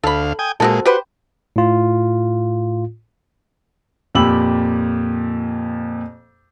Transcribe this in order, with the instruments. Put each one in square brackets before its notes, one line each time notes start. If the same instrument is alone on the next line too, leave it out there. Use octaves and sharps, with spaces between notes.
[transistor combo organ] D2 F5 [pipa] A4 B5
[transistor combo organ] G5 G#5 D#6
[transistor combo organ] A#2 G#3 [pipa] C4 F#4 A4
[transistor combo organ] F#4 [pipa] G4 B4 C5
[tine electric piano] A2 F4
[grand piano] F2 A#2 G4 B5 E6 F#7